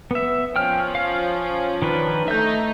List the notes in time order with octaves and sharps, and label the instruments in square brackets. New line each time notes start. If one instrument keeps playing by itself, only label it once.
[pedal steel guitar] B3 E5
[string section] F3 C#4 [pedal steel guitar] G5 F6
[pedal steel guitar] F5
D#3 D4 B4
[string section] A3 D#4 [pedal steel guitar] E5 G6